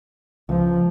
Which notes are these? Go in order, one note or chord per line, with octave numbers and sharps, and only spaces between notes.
C#2 F3